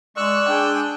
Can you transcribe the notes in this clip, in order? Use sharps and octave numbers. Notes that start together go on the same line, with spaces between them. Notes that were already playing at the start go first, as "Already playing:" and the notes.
G#3 D5 C#6 E6 F#6
D4 G#4 G5